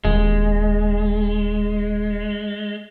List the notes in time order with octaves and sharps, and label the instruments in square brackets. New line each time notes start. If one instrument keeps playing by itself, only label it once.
[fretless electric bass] D#1 [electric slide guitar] G#3